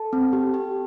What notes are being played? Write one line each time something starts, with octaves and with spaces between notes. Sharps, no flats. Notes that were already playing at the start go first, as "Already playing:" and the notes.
Already playing: A4 A5
C4
G4
G4